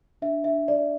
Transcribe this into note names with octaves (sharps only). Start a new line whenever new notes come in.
D4 E5
D4 E5
D5